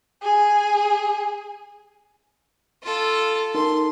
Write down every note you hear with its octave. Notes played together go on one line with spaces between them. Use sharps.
G#4
F4 A4
D#4 A#4 A5 C6